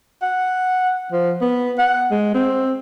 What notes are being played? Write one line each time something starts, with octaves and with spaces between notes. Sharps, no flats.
F#5
F3
B3
F#5
G#3
C4